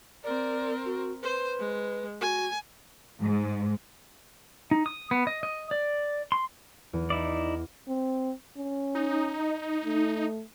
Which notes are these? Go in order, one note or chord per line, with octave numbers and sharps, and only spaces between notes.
C4 A#4 D5
F#4
B4 C5
G#3
F#4 G#5
G#2
D#4
D#6
B3
D#5
D#5
D5
C6
E2
D#4 E4 D5
C4
C#4
D#4
A3